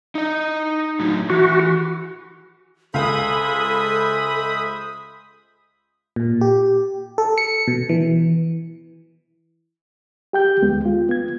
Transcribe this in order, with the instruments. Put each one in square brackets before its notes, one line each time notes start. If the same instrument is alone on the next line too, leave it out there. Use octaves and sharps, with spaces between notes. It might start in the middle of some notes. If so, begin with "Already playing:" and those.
[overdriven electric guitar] D#4 D#5
A2 F#3
[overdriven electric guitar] E3 [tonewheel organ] F#4
[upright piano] C#2 F5 [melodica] G#3 C5 E5 [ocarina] A4 [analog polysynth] B5 D#6
[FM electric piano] A#2
G4
A4
C#7
B2
E3
[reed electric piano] G4 G5 G6
D2 G#3 B3
F4
B3 G#6